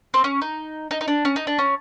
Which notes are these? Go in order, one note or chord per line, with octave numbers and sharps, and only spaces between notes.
C4
C#4
D#4
D#4
D#4
D4
C#4
D#4
D4
C#4